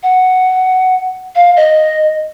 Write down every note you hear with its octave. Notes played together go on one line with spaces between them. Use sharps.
F#5
F5
D#5